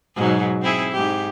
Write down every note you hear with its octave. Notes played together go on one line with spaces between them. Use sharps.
G#2 B2 F#3
C4 E4 G#4
G#2 G4